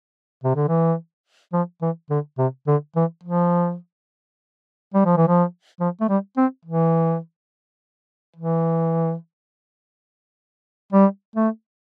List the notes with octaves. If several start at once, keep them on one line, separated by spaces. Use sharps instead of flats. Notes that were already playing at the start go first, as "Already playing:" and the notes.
C3
D3
E3
F3
E3
D3
C3
D3
E3
F3
G3
F3
E3
F3
F3
A3
G3
C4
E3
E3
G3
A3